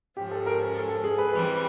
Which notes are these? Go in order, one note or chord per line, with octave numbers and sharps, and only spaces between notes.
G#2 F3 G#3 C#4 G4
A4
A#4
A4
A4
G#4
B4
E3 G3 C4 B4